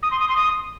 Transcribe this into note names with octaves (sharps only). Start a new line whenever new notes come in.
D#6
C6
D#6
C6
D#6